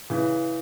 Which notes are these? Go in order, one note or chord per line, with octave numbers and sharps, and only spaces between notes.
C#3 E3